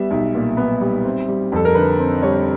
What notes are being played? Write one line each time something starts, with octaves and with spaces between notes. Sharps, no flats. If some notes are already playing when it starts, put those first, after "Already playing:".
Already playing: G3 B3 E5
B1
A#2
B3
G3
C4
G3
F2 A4
A#4
D3 B4
C4
G3 C#5